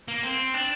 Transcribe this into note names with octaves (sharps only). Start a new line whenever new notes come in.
A#3
C4
D4